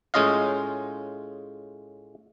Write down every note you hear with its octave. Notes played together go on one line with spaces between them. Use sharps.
A2 G#3 C#4 F4 D#5 F5